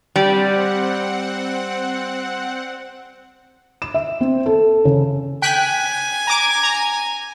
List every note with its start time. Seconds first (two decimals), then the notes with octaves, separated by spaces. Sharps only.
0.16 G3 C4 F#5
3.82 E7
3.94 E5
4.21 C4
4.46 A4
4.85 C#3
5.42 G5 G#5 F#6 B6
6.27 A#5 D6
6.63 A#5